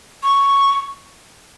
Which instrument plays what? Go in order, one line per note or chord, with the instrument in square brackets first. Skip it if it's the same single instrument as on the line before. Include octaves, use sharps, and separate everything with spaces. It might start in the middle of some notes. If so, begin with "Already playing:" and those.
[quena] C#6